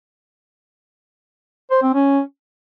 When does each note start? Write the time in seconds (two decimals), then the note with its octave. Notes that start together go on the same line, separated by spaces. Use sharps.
1.71 C5
1.82 C4
1.94 C#4